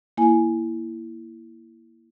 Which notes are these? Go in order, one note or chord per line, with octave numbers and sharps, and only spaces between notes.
A#3 E4 G#5